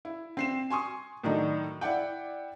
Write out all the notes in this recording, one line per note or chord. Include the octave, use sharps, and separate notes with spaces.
E4
C4 C7 E7
G#5 C6 C#6 D#6
A2 D#3 F#3 D4 D#4
E4 D5 F#5 G5